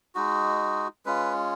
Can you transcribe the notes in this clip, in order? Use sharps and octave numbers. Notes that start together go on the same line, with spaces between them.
G#3 D#4 F#4
G#3 C#4 F4 B4